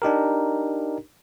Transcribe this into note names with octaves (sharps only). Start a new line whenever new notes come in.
D4 D#4 G4 A#4